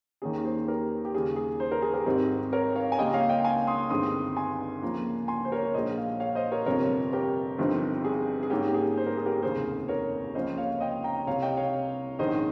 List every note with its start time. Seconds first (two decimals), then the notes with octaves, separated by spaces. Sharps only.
0.22 D#2 D#3 A#3 C#4 G#4
0.44 G#4 C5
0.68 G4 A#4
1.05 G4
1.14 D#2 C#3 G3 G#4
1.36 G#4
1.60 C5
1.72 A#4
1.82 G#4
1.94 G4 A#4
2.06 G#1 G#2 G3 C4 D#4
2.53 A#4 C#5
2.75 C#5 F5
2.92 G#5
2.98 C#2 C#3 G3 A#3 D#5 G5
3.13 C#5 F5
3.29 D#5 G5
3.45 F5 G#5
3.67 C6 D#6
3.90 G1 G2 D#3 G#3 C4 C6 D#6
4.36 G#5 C6
4.82 C#2 C#3 F3 A#3
5.28 G#5 C6
5.45 C5
5.52 A#4 C#5
5.65 C#5
5.74 A#1 A#2 G#3 C5 D#5
5.97 C#5 F5
6.20 C#5 F5
6.35 C5 D#5
6.52 A#4 C#5
6.66 G1 F2 C3 F3 C4 A#4 C#5
7.13 G4 A#4
7.58 G1 G2 F3 C4 D#4
8.05 G#4
8.43 G#4
8.50 G#2 G3 A#3 C#4 G4
8.68 G4
8.74 G#4
8.97 C5
9.06 A#4
9.17 G#4
9.26 G4 A#4
9.42 F1 D#2 C#3 G#4 C5
9.88 A#4 C#5
10.35 C#2 C#3 F3 A#3 C#4 C5 D#5
10.57 C#5 F5
10.80 D#5 G5
11.04 G5 A#5
11.27 C2 C3 G3 C#5 F5
11.43 D#5 G5
11.57 C#5 F5
12.19 A#1 G#2 D#3 G#3 C#4 C5 D#5